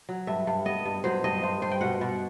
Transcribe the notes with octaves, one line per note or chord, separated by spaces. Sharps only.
F#3
G2 E5
G2
B3 D#5
G2
F#3 C5
G2 D#5
G2 C5
G2 C5
G5
B2 F#5
B2